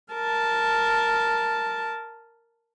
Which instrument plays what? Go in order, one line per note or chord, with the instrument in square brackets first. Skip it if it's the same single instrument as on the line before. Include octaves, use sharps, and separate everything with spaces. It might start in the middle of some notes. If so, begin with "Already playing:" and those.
[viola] A#4 A5